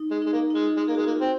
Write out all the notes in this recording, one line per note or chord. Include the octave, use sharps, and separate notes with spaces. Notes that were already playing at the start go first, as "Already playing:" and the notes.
Already playing: D#4
G#3
G#3 D#4
A#3
D#4
G#3 F4
G#3
A#3 G#4
G#3 F#4
F4
A#3
F#4
C4